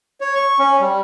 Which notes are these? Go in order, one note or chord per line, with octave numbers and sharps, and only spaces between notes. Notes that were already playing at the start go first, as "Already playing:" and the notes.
C#5
C#6
C#4
G3